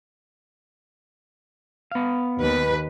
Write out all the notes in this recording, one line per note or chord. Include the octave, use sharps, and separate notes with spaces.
B3 F5
D#2 B4